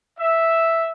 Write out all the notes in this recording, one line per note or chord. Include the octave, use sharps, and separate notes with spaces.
E5